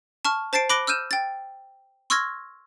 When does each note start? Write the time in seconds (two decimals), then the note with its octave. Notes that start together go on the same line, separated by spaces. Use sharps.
0.25 A5 C#6 F6
0.53 C5 A5 A6 C7 D7
0.70 B5 D6 F#6 A#6 D7 G7
0.87 E6 F6 G6 D#7 E7
1.11 G5 A6
2.10 C6 C#6 E6 F6 G#6 A#6